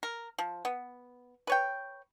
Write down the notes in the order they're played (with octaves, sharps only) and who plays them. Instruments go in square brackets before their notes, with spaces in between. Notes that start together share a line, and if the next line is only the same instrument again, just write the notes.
[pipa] A#4
F3
B3
B4 C#5 G5